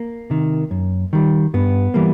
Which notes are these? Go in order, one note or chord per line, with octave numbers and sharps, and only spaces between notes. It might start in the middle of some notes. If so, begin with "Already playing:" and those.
Already playing: A#3
C3 D#3
F#2
D#3 G3
G2 B3
E3 G3 A#3